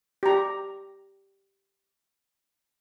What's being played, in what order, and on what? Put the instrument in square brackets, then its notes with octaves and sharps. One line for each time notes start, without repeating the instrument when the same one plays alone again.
[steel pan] G4 A#5